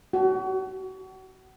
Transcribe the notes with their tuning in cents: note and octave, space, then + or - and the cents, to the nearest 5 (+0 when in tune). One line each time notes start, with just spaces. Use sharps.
F#4 +35